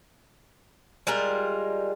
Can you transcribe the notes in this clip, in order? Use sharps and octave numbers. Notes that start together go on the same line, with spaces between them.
G3 G#3 F4 A#4